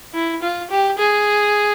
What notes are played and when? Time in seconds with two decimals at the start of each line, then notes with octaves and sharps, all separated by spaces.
0.14 E4
0.42 F4
0.70 G4
0.99 G#4